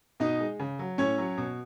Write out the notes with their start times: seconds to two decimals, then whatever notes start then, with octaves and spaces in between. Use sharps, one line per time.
0.20 B2 D#4 D#5
0.40 G#3
0.60 C#3
0.79 F#3
0.98 A2 C#4 C#5
1.18 F#3
1.38 B2